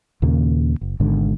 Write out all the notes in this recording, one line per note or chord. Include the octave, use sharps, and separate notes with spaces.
D#2 A#2 C#3 A#3
F#1
G#1 G#2 B2 D3